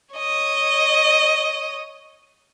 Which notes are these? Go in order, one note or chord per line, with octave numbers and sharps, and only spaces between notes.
C#5 D#5